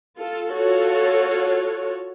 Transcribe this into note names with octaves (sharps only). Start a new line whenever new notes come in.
F4 A4
F4 F#4 A4 C#5